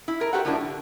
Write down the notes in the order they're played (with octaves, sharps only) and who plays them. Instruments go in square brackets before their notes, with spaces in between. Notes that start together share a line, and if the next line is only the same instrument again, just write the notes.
[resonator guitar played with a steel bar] E4
G#4 A#4
F#4 G4 A4 B4 C5 F#5
F#2 A2 F3 A#3 D4 E4
D3